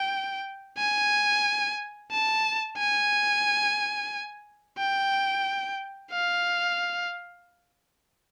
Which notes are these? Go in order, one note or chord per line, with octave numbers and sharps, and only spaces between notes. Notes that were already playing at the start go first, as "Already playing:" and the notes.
Already playing: G5
G#5
A5
G#5
G5
F5